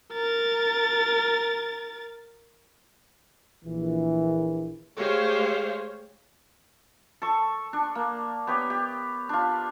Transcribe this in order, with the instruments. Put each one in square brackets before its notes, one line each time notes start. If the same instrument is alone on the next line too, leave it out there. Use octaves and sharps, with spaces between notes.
[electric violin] A#4 A6
[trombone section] A#1 E3
[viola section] G#3 A3 G4 C5 C#5 F5
[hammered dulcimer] A4 C#6
D4
A#3
B3 G4 C#5
G4
D4 F4